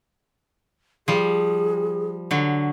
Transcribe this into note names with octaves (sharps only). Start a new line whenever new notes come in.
F3 G3 G#4
D3 F#3